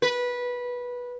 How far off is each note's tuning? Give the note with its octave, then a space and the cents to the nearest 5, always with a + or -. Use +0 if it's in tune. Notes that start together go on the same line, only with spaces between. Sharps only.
B4 -15